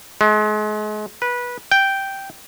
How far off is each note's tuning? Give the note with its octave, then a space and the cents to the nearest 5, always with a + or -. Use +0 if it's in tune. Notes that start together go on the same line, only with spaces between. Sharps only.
G#3 +35
B4 -20
G5 -5